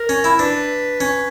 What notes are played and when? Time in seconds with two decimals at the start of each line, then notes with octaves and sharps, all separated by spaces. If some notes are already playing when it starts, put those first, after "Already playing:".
Already playing: A#4
0.09 C#4
0.24 E4
0.39 D4 B4
1.00 C#4